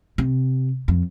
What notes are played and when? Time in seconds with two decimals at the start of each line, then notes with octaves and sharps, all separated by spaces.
0.18 C3
0.88 F2